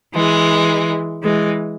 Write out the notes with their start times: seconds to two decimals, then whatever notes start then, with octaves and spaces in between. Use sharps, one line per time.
0.14 E3 G#3
1.23 E3 G#3